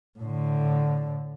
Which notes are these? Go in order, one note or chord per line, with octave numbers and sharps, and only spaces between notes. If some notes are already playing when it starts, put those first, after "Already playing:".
A2 D3